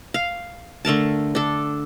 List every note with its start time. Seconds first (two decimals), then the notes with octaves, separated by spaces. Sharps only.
0.14 F5
0.85 D3 A3 A#4 A5
1.35 D4 A4